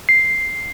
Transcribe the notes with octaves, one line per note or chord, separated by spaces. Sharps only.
C7